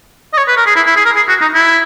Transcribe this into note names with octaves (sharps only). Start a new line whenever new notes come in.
D#5
C#5
B4
A#4
G#4
E4
E4
G#4
A#4
G#4
F#4
D#4
E4